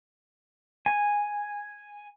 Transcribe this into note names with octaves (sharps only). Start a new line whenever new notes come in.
G#5